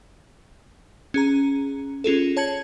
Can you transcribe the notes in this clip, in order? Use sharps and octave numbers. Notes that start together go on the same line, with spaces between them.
C#4 G#4 A#5
C#4 F4 G#4 A4
C#5 A5 G#6 C#7 F#7